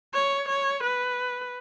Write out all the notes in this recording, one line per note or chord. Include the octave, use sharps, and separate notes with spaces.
C#5
C#5
B4